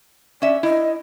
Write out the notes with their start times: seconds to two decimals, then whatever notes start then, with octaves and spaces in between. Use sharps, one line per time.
0.42 C#4 D5 E5
0.63 E4 D#5